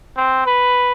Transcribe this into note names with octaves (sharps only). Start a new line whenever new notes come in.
C4
B4